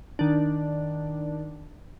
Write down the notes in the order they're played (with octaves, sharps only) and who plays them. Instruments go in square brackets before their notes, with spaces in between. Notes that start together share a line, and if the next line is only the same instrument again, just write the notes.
[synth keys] D#3 D4